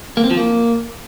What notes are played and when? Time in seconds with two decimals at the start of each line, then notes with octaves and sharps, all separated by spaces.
0.17 A#3
0.24 C4
0.31 F3
0.37 A#3